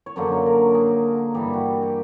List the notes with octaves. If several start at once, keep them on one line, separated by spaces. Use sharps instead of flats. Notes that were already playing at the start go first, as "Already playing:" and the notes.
C#5
F#2 D3 F#3 A#3 C5
A#4
G#4
G2 E3 G3 G4
F#4
G4